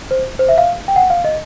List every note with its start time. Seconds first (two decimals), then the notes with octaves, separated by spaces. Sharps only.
0.11 C5
0.39 C5
0.49 E5
0.58 F5
0.88 G5
0.96 F#5
1.10 F5
1.24 D#5